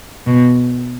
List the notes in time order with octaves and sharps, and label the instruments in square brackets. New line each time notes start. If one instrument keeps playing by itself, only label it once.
[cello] B2